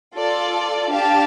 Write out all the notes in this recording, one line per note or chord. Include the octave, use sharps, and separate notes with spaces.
F4 A4 D5
D4 G4 F5 A5